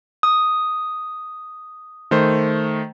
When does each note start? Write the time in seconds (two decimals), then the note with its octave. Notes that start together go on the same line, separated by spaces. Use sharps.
0.23 D#6
2.11 D#3 A3 C5